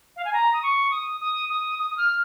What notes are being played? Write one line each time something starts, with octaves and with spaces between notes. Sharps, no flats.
F5
G#5
A#5
D#6
C#6
D#6
D#6
D#6
D#6
D#6
F6